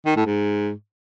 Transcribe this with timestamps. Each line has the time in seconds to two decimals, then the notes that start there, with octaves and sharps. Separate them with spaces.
0.06 D#3
0.16 A2
0.26 G#2